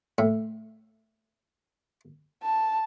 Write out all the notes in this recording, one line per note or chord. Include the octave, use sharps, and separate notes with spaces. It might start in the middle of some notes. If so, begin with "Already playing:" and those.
A2
A5